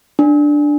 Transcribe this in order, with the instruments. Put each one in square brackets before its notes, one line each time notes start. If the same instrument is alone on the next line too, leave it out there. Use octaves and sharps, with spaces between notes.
[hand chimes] D4